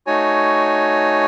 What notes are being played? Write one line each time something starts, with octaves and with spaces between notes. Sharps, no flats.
A3 D#4 F#4 C#5 G#5